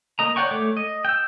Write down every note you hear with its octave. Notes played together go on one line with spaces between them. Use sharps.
A#3 D#5 A#5
C#5 D5 F#5 G5 C#6
A3 C#5 D6
D#5
G5 E6